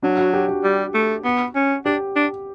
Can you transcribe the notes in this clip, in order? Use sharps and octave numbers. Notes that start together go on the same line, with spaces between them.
F#3 D4
F#4
G4
F#4
G3
A3
B3
C#4
D4 G4
D4